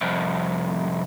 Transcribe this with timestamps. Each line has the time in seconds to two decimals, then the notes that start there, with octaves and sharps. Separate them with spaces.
0.01 C2 F2